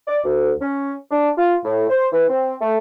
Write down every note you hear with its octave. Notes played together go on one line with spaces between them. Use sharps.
D5
D2
C#4
D4
F4
A2
C5
E3
C4
A3